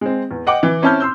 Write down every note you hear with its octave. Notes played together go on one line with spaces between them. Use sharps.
G#3 C4
E2
D#5 F#5 G5 D6
E3
C4 C#4 E4 A5 F6 G6
C6 E6 G6